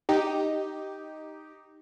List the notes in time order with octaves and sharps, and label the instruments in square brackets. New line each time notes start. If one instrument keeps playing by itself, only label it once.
[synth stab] D#4 G4